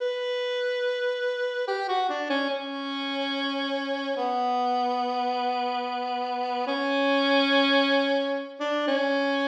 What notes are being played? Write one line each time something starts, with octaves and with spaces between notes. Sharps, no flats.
B4
G4
F#4
D4
C#4
C#4
B3
C#4
D4
C#4